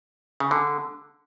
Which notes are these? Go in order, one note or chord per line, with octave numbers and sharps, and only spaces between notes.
C#3
D3